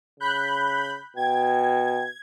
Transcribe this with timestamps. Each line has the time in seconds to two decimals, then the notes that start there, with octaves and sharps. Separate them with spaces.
0.20 C#3 B5 F#6 G6
1.16 B2 G5 G#6